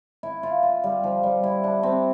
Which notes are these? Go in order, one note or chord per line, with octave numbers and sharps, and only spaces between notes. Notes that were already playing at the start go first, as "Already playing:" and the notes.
E4
F4
F4
G3
F3
G3
E4
D4
C4